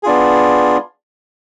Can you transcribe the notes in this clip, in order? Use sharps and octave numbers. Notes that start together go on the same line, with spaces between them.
B3 D4 F4 G#4